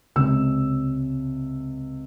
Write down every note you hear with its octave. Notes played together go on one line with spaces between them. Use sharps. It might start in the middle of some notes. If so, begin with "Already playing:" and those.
C#2 C3 C#4 E6